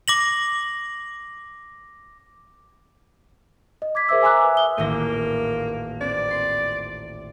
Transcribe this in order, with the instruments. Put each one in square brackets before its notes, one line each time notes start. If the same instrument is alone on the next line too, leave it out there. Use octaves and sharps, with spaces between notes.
[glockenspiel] D6 A#6 F#7
[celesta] D#5
D6 G#6 B6
G#4 A#4 C5 E5 D6 E6
G#5 A#5 C6 D6 E6 F#6
B4 E5
E5 D#6 G7
[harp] D#1 A1 A#6 [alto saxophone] A#3
[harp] C4 [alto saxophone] D5
[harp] C6